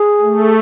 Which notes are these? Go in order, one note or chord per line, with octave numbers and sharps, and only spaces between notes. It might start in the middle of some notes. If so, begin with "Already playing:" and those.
Already playing: G#4
A3